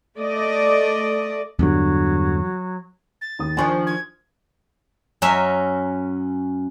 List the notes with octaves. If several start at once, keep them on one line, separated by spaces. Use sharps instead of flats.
A3 D5 D#5
E2 G2 D3 F#3
A6
D#2 D#6
D#3 F3 D4 G#5 C6 C#6
G#6
F#2 C#4 A#4 E5